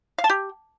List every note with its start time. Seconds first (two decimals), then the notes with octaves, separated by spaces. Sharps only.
0.18 F5
0.24 A5
0.30 G4